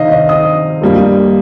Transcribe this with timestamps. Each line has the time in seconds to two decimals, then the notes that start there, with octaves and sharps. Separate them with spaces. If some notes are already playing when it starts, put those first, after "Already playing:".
Already playing: C3 D#3 C4 D#5 F5
0.11 D#5
0.29 D#6
0.81 G2 G3 A#3